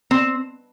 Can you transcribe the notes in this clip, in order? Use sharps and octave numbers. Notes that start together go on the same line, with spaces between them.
C4